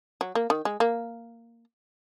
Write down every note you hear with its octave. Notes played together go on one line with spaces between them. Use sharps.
F#3
A#3
D#3
G#3
A#3